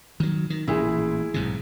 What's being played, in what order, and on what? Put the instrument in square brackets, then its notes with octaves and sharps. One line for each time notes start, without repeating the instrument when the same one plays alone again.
[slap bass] D#3 F#3
D#3
[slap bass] A1 A#2 [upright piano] E4 G#4
[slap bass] B1 G#2 C3